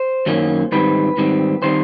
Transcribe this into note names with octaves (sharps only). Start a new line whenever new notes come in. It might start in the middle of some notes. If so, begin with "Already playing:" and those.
Already playing: C5
F#2 D#3 F#3 A#3 C#4
G#2 D#3 G3 C4 B4
G#2 D#3 G3 C4
D#3 G3 C4 C5